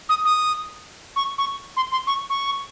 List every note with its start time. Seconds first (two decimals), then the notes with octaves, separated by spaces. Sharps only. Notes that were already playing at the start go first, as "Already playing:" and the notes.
0.09 D#6
0.25 D#6
1.16 C#6
1.38 C#6
1.77 C6
1.92 C6
2.07 C#6
2.30 C#6